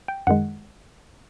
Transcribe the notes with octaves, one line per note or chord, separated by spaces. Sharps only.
G5
F#2 D#3 G#3 F#5